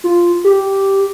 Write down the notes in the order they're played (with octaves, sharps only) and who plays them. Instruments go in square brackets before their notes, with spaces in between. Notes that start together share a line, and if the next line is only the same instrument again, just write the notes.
[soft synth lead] F4
G4